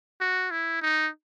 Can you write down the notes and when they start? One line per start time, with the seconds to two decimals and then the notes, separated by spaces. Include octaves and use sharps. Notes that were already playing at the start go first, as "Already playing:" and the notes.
0.21 F#4
0.51 E4
0.82 D#4